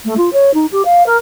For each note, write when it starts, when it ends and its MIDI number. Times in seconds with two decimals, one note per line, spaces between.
0.05 0.14 57
0.17 0.32 65
0.32 0.53 73
0.53 0.66 63
0.71 0.84 67
0.84 1.05 77
1.06 1.16 70